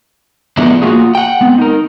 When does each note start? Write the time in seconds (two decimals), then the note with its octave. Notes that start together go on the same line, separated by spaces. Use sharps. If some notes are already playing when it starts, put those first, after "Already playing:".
0.57 F3 G#3 A3 B3 D4 E4
0.82 A#3 F4 F#4 G#4
1.15 F#5 G5
1.41 G#3 B3 C4
1.58 D#4 A#4